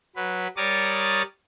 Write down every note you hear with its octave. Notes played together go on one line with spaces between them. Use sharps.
F#3 B4
G3 A#4 C#5 D5 D#6 A6